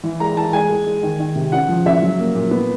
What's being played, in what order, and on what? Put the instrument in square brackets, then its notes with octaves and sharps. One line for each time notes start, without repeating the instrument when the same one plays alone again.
[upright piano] E3
G#3 A#5
E3 A5
G#3 G#5
G#3
G#3
D#3
D#3
C3
C#3 F#5
F3
C#3 E5
F#3
A#3
A#2
B3